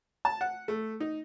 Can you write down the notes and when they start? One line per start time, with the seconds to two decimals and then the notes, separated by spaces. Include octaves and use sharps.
0.25 A5
0.41 F#5
0.68 A3
1.00 D#4